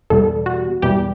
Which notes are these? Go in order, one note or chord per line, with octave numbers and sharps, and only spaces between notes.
E2 B2 G3 A4
F#4
E2 B2 G3 G4